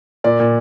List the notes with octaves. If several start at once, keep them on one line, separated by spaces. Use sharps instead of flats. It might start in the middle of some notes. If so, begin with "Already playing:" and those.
A#2 D5
A#2